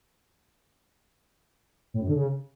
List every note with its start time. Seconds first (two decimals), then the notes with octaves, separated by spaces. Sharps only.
1.94 A2
2.01 F#2
2.08 D3
2.14 C#3